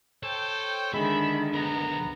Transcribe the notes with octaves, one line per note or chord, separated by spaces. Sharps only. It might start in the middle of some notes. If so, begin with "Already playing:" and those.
A4 C5 C#5 G5
D3 D#3 G#3 E5 B5
B1 B3 A#4 A#5